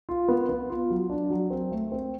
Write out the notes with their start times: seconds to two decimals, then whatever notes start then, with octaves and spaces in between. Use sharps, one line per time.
0.09 F4
0.28 B3
0.49 B3
0.70 F4
0.90 F#3
1.10 D4
1.30 F#3
1.50 C4
1.72 A3
1.92 C4